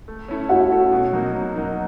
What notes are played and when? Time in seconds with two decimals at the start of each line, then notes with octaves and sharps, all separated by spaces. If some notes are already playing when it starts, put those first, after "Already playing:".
0.08 A3
0.28 C#4 E4 A4
0.49 A3 F#4 F#5
0.71 C#4 E4 A4
0.92 B2
1.13 F#3 A#3 D#4 F#4
1.34 B2
1.55 F#3 A#3 D#4 F#4